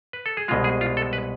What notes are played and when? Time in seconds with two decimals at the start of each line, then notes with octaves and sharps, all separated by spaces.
0.13 B4
0.26 A4
0.37 G#4
0.48 C2 B2 G#3 F4
0.64 G#4
0.81 F4
0.97 A4
1.13 B4